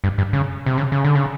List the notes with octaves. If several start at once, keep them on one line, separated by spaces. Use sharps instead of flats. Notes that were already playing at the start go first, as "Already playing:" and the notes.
G2
G2
C#3
C3
C#3
C#3
D3
C#3